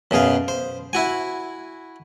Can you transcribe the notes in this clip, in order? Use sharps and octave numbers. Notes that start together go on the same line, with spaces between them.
F#2 B2 G#4 F5
C5
E4 F#4 G#5